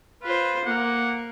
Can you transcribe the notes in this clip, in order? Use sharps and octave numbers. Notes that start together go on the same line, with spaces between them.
F4 B4 C5
A#3 F#5